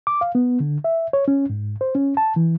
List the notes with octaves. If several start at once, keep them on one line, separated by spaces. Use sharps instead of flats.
D6
F5
B3
D3
E5
C#5
C#4
G#2
C5
C#4
A5
E3